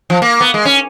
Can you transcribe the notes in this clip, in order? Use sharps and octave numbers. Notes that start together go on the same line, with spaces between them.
F3
A#3
B3
G#3
C#4